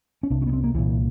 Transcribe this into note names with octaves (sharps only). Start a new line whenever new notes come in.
C#4
C2 C3 D4
C#4
B3
C4
A#3
C2 A#2 E3